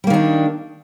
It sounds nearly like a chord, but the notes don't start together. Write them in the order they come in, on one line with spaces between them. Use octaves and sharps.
G3 A#3 D#3 D4